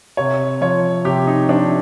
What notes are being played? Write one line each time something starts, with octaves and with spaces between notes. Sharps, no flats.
C3 C#5
F3 C#5
C3 G4
D#4
F3 D4